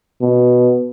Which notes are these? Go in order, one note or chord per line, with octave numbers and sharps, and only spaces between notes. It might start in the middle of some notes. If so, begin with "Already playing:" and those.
B2